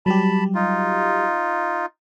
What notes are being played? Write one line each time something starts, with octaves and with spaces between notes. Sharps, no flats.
F#3 G3 G4 A5 B5
D#4 F4